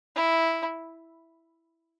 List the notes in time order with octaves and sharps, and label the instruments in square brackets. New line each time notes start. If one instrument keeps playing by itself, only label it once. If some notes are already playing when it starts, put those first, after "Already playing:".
[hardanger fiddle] E4